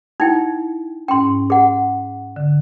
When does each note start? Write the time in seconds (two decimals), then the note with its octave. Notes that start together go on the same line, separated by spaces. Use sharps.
0.20 D#4 E4 F#5 G5
1.08 G#2 C#4 G5 C6
1.50 G#4 F#5
2.36 D3